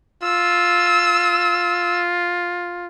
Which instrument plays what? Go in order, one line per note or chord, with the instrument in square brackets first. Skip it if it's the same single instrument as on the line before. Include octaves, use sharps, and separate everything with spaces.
[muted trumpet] F4 [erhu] E6